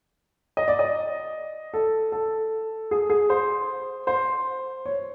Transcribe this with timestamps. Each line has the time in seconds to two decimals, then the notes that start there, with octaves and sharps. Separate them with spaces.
0.57 D#5
0.68 D5
0.79 D#5
1.74 A4
2.12 A4
2.91 G#4
3.10 G#4
3.30 C5
4.07 C5
4.86 C#5